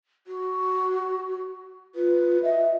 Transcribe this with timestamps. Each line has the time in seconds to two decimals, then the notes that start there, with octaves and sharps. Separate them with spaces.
0.27 F#4
1.95 F4 B4
2.43 D#5 E5